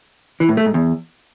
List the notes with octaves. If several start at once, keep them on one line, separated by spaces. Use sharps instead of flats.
E3
A2
A3
G#2
E2